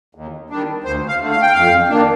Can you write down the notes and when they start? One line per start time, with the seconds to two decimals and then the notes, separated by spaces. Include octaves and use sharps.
0.15 D#2
0.50 D#3 G3 D4
0.84 D2 C5
1.08 F5
1.20 D3 A3
1.31 F5
1.42 G5
1.53 F2 F5
1.89 D#3 A#3 D4